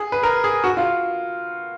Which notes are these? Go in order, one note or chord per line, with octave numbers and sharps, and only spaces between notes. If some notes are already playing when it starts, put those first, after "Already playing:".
Already playing: G#4
B4
A#4
G#4
F#4
F4